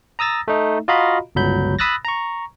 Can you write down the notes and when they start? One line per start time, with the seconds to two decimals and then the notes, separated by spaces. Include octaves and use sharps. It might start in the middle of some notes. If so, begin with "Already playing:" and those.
0.19 A#5 D#6 E6 A6 A#6
0.48 A3 D#4
0.88 F4 F#4 D#5 F5 A#5 B5
1.35 G1 C#2 F#3 B5 G6
1.79 B5 D#6 E6 F#6 A6 A#6
2.05 A#5 C#6